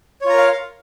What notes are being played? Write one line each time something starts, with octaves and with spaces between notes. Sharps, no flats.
F4 A#4 C#5 F5 A#5